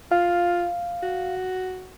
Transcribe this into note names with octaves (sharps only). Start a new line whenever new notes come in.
F4 F5
F#4